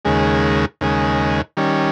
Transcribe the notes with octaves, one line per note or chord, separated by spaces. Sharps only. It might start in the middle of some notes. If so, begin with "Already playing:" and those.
D#2 C#3 G#3
D#2 C#3 G#3
D#3 G3 C#4